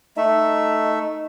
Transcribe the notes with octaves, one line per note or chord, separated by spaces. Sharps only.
A3 D#4 E5